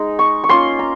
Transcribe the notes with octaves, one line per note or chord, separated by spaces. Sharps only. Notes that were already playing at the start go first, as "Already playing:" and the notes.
Already playing: G#3 D#4
C#6
C#6
A#3 C#4 F4 C6
A#5